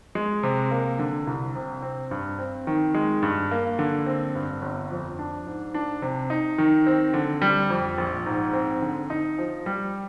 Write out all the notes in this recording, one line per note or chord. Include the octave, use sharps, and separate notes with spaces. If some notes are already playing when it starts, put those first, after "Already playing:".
G#3
C3
A#3
D3
C2
C3
C4
G2
C4
D#3
G#3
G2
A#3
D3
C4
G2
G1
F2
D4
G#2
D4
C3
D#4
D#3
C4
D3
G3
F2
A#1
G#2
C4
D3
D#4
F3
G3